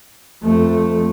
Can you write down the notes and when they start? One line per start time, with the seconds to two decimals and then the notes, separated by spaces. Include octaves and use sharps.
0.43 F2 A3